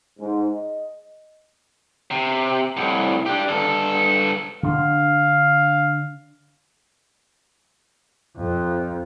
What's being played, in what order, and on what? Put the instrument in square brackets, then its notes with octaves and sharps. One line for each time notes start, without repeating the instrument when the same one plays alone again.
[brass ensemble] G#2
D#5
[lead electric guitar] C3
C2 A2
D4 G4
G2 A4
[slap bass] D3 D4 [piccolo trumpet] F5
[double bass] F2